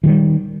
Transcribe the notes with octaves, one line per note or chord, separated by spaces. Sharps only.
D#3 E3 G3